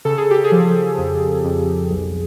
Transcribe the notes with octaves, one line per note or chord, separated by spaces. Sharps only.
C#3 A4
G#4
G4
G#4
F3
F2
F2
B1